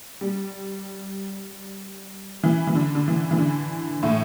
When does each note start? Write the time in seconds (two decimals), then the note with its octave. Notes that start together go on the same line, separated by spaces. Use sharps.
0.21 G3
2.43 E3
2.67 E3
2.75 D3
2.95 D3
3.08 E3
3.31 E3
3.38 D3
4.03 A2